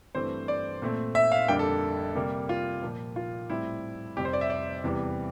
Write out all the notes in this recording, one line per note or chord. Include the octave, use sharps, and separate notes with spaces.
G2 E3 A3 C4 C5
D5
A#2 A3 C4
E5
F5
F2 D3 G3 A#3 G5
A4
C3 G3 A#3
F4
A#2 F3 A#3
F4
A2 G3 C4 E4
F2 C3 G3 C4 G4
C5
D5
E5
D5
E2 C3 E3 G3